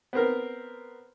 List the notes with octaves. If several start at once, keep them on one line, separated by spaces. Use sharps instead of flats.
B3 C4 A#4